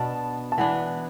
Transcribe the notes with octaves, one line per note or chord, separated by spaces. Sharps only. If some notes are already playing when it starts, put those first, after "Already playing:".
Already playing: B2 B3 D4 A5
A5
E3 B3 D4 F#5